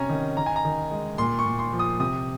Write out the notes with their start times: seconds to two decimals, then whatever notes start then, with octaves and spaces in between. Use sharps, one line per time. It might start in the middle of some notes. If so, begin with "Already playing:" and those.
Already playing: C3 C#4 G#5 A#5
0.09 D#3
0.37 D#3 A#5
0.46 G#5
0.56 A#5
0.65 D#3
0.91 G#3
1.18 A#2 C6
1.39 C#6
1.46 A#2
1.59 C6
1.73 F3
1.79 D#6
1.99 C3 D#6